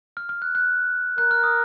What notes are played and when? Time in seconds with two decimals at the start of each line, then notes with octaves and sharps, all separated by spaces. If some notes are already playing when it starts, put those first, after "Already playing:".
0.17 F6
0.29 F6
0.42 F#6
0.55 F#6
1.18 A#4 F#6
1.31 F6
1.44 D#6